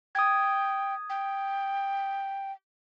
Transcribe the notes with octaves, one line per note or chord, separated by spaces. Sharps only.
G5 D#6 G#6
G5